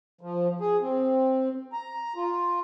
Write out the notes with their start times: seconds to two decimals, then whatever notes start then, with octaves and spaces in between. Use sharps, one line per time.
0.21 F3
0.61 G#4
0.81 C4
1.73 A#5
2.16 F4